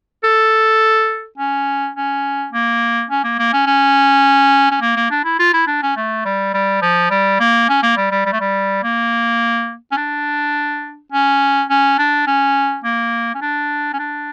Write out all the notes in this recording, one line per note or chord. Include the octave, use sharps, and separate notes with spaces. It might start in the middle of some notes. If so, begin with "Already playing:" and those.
A4
C#4
C#4
A#3
C#4
A#3
A#3
C#4
C#4
C#4
A#3
A#3
D4
E4
F4
E4
D4
C#4
A3
G3
G3
F3
G3
A#3
C#4
A#3
G3
G3
G3
A3
G3
A#3
C#4
D4
C#4
C#4
D4
C#4
A#3
C#4
D4
C#4
D4